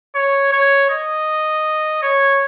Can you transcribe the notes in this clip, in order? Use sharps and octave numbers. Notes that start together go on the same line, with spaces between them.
C#5
C#5
D#5
C#5